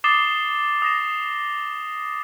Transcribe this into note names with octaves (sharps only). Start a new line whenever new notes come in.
D6 D#6 A6 C7 E7 G7
D#6 A#6 E7